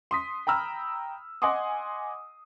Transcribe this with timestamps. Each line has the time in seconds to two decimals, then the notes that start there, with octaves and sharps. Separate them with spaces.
0.11 C6 D#6 B6
0.47 G5 A#5 B5 E6 F6
1.42 D#5 F#5 G#5 C6 D6 D#6